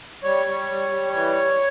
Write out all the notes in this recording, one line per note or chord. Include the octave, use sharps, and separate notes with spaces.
G3 C#5
G3
G3
G3
E3 C#5